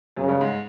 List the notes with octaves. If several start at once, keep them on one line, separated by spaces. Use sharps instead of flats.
F#2 C#3 F#3
G2 G3
G#2 G#3